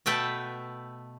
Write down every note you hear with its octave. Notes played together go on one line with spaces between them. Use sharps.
B2 A3 B4 G5 A5